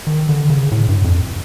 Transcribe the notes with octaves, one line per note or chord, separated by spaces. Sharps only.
D#3
D3
C#3
A2
G2
F2